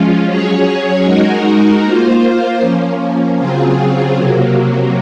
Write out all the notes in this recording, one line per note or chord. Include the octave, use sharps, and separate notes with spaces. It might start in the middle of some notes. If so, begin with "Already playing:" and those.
Already playing: F3 G#3 C#4 F4
F#3 C#4 G#4 C#5
G#3 D#4 F#4 A#4
A#3 F4 C5
F3 A#3 C#4
C#3 F#3 C4 F4 G#4
C3 F#3 A#3